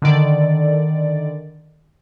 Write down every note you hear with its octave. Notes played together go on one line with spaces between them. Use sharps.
D3 D#3 D5